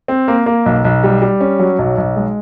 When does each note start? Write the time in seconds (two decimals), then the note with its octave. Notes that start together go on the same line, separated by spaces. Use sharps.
0.08 C4
0.28 A#3
0.46 A#3
0.66 B1
0.85 B1
1.04 G3
1.22 G3
1.41 C#4
1.59 F#3
1.79 B1
1.98 B1
2.16 G#3